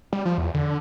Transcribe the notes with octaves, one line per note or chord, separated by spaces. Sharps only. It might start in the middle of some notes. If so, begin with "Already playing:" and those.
G3
F3
E2
D3